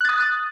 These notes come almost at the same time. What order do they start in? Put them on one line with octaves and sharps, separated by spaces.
F#6 A6 D#6